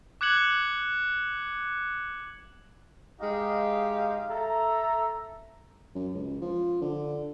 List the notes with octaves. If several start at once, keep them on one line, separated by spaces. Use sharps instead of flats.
D6 F#6 G#6 C#7 F#7
G#3 D#4 G4 F5
A4 E5 A#5
F#2
C#2
F3
D3